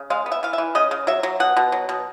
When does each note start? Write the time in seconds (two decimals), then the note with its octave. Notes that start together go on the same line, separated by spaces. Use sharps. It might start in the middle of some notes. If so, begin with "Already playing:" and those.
Already playing: C#3
0.10 G#3 F5
0.26 B3
0.32 E5
0.43 E3 F5
0.53 E5
0.58 E3
0.75 C#3 D#5
0.91 C#3
1.07 F#3 E5
1.23 F#3
1.40 B2 F#5
1.57 B2
1.72 F#3
1.89 B2